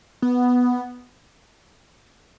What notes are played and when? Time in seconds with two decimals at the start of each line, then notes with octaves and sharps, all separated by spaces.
0.22 B3